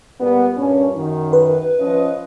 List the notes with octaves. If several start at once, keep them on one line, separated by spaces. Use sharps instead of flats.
A#2 G3 B3
G2 A#2 C#4
F#2 D#3
B4
F3 C#4 D#5